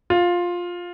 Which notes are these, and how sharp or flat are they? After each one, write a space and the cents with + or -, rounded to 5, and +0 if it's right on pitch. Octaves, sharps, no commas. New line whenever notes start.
F4 +10